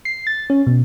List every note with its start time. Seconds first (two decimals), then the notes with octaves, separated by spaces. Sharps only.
0.05 C7
0.27 A6
0.50 C#4
0.67 B2